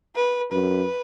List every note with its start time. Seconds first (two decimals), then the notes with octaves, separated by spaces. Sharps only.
0.15 B4
0.51 F#2 B4